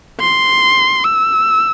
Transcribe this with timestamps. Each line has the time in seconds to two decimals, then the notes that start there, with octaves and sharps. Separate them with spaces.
0.20 C6
1.04 E6